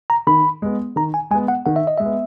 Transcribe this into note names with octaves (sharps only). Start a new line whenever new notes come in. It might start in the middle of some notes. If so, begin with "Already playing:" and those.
A#5
D#3 B5
G#3 B3
D#3 A#5
G#5
G#3 B3 G#5
F#5
D#3 F#5
E5
D#5
G#3 E5
B3